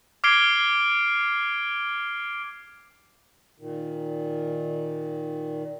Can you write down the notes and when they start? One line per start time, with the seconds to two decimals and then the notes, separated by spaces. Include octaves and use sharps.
0.24 D6 F6 G#6 C7 D7 G7
3.60 A#2 D#3